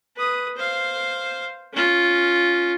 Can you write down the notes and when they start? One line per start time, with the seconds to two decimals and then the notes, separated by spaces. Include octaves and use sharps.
0.17 B4 D#6
0.57 C5 F5
1.73 C#4 F4